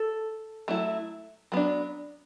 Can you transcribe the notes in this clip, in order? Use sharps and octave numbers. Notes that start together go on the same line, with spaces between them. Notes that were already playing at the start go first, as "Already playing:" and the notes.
Already playing: A4
F#3 A3 E4
F#3 B3 D4